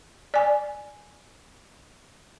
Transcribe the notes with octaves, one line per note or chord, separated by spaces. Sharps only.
D5 G#5